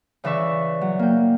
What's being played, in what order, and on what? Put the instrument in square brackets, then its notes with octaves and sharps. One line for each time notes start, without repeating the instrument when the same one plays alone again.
[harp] C#3 E3 D5 E5 C#6
F#3
A#3 G5